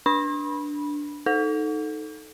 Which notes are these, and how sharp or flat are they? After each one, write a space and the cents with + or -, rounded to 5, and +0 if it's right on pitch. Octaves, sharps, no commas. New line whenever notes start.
D4 +0 B5 -15
D#4 +0 A4 -5